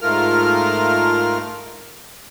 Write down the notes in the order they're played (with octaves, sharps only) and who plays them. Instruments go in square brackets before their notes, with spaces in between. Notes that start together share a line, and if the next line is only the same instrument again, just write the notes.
[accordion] G#2 A3 F4 A#4 F6